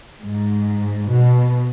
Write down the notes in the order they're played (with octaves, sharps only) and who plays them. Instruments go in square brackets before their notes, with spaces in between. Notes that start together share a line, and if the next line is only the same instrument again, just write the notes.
[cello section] G#2
B2